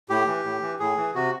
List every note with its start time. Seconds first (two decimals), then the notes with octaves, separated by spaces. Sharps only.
0.09 A2 G4
0.27 E3
0.44 A2
0.61 E3
0.79 A2 G#4
0.97 E3
1.15 C3 F#4